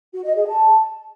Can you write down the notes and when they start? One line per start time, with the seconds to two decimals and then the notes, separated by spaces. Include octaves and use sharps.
0.13 F#4
0.24 D#5
0.36 G#4
0.47 A5